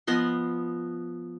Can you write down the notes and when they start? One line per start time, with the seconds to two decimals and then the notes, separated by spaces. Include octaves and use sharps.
0.07 F3 B3 D#5 C6